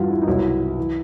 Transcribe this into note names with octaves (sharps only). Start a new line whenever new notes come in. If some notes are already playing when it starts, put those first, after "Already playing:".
Already playing: G2 E3 F4 F#4
E4
D#4
C2 B2 F#3 E4
E3